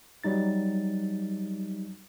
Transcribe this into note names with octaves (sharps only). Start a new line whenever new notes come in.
F#3 G3 D#4 A6